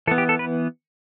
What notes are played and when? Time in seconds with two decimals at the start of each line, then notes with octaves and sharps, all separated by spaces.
0.07 E3 A4
0.11 B3
0.18 G4
0.29 A4
0.39 B4